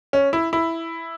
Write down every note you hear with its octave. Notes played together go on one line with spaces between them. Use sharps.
C#4
E4
E4